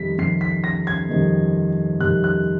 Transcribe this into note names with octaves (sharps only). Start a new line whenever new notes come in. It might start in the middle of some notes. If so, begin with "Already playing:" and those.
Already playing: F2 C3 D#3 G3 B6
F2 C3 D#3 G3 C7
B6
A#6
G#6
F2 C3 D#3 G3
F2 C3 D#3 G3 F#6
F#6